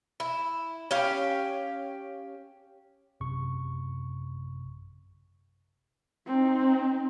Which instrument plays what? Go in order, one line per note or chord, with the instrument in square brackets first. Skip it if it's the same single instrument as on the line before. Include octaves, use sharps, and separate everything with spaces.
[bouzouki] E4
C#4 G4 F5
[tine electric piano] A1 F#2 C3 C#6
[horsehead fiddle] C4 D#4